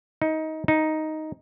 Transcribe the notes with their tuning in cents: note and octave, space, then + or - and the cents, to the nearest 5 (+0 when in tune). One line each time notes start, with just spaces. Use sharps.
D#4 +20
D#4 +5